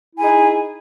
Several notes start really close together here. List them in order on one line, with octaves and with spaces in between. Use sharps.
E4 G#5 G#4 D#4